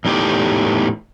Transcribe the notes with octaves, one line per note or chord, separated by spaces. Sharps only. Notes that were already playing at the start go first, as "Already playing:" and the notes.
E2 A2 D#4 G4